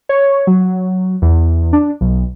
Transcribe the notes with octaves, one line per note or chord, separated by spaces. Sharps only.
C#5
F#3
E2
D4
B1